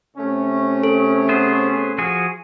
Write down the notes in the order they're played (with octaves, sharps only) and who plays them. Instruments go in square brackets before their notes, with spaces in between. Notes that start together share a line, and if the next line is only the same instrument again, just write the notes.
[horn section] C3 A3 C#4
[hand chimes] A4
[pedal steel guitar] B3 G#4 C5
F3 F#4 G#4